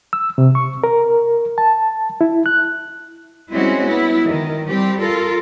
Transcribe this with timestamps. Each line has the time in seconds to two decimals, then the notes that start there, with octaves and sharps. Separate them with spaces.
0.13 E6
0.38 C3
0.55 C#6
0.84 A#4
1.58 A5
2.21 E4
2.46 F#6
3.53 G3 G#3 C4 C#4 E4 F#4
3.87 B3 E4
4.26 D#3
4.68 G3 C4 G4
5.01 F4 A4 A#4